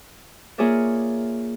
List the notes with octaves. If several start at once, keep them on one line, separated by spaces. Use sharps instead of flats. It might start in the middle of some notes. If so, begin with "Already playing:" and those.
A#3 F4 G#4 C#5 D5 E5